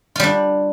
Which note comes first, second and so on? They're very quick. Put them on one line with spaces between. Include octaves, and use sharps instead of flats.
F4 G3 D4